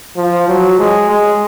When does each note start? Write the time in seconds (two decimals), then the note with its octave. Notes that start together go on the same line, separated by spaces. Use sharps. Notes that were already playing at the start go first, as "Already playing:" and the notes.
0.17 F3
0.48 F#3
0.79 G#3
1.10 G#3